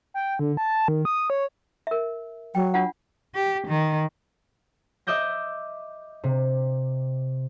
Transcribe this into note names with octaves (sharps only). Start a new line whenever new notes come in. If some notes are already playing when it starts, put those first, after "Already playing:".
G5
D3
A5
D#3
D#6
C#5
A#4 E5
F#3 G5
D4 F4 F#5
G4
D#3
D#5 E5 D6 G6 A#6
C3